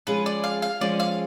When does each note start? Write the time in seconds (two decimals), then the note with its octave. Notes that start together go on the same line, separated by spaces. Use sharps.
0.07 F3 G#3 C#4 F4 G#4 B4
0.26 D5
0.44 F5
0.62 F5
0.81 F3 G#3 C#4 F4 G#4 D5
1.00 F5